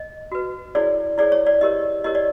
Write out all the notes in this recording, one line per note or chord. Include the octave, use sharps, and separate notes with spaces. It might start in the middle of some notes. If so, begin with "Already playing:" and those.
Already playing: D#5
F#4 B4
E4 G#4 C#5 D5
E4 G#4 C#5 D5
C#5
D5
E4 G4 A#4 C#5 D#5
E4 G4 A#4 C#5 D#5
D5